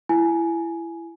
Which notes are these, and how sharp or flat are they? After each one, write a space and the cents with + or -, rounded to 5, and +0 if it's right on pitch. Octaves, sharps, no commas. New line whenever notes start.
E4 +25 G#5 +15